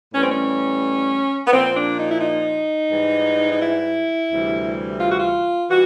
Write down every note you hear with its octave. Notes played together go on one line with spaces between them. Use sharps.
A2 E3 G3 C#4
C4
C#4
B3
A#2 F3 C4
D4
D#4
E4
D#4
G#2 E3 G3
D#4
E4
D2 C3 E3 G3
F4
F#4
F4
E3 G3 F#4